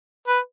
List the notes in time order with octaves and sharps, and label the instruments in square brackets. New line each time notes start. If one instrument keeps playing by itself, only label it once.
[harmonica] B4